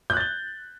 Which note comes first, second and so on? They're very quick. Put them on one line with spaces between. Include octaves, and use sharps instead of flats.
G6 F#6 A6 G7